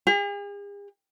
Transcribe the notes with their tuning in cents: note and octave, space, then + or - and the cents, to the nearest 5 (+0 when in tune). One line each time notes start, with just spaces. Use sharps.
G#4 -45